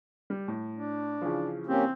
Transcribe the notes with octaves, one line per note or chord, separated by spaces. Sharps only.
G3
A2
D4
C#3 E3 F3
A#3 C4 C#4 G4